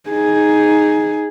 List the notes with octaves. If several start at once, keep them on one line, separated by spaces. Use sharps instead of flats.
D#4 G#4